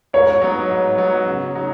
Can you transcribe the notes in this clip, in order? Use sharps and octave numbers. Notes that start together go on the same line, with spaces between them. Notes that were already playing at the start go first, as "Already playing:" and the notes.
G#2 C#5
F#3 B3 D#4
G#2
F#3 B3 D#4
C#3
F#3 D#4